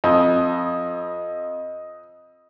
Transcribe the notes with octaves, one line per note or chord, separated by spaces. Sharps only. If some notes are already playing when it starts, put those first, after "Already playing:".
F2 D#5